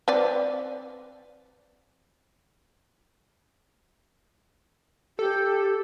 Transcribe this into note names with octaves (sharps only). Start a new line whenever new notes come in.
C4 B4 D5
G4 A4